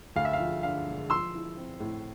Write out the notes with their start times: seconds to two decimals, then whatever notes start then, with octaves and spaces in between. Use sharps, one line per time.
0.16 D2 F5
0.25 E5
0.33 F5
0.40 F3
0.63 D3 F5
0.87 E1
1.10 F3 C6 E6
1.34 E4
1.57 C4
1.80 A2